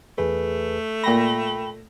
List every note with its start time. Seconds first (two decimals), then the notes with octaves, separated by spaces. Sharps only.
0.18 E2 A3 G#4 B4
1.04 A#2 G5 B5 A#6